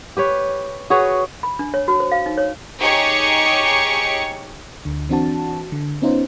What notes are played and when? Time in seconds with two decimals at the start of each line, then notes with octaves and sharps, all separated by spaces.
0.17 G4 B4 C#5
0.90 F#4 G#4 B4 C#5
1.43 B5
1.59 D4
1.74 C#5
1.88 F#4
2.00 C5
2.12 F5
2.26 D#4
2.38 C#5
2.80 D#4 G4 G#4 C#5 C#6
4.85 D2 D3
5.09 E3 C4 D4 F#4 A5
5.72 D3
6.02 B3 C#4 D#4 F4 C5